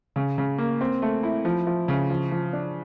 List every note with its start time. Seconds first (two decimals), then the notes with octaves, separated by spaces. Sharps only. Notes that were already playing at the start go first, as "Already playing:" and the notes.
0.16 C#3
0.38 C#3
0.58 A#3
0.81 C4
1.02 A3
1.23 E4
1.45 F3
1.67 F3
1.88 C#3
2.10 F3
2.31 F3
2.53 D4